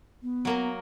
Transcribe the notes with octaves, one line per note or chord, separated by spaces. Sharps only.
B3
F#3 A#3 A#4